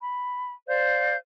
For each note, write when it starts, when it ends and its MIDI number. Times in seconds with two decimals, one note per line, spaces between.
0.01 0.51 83
0.68 1.16 72
0.68 1.16 74
0.68 1.16 77
0.68 1.16 91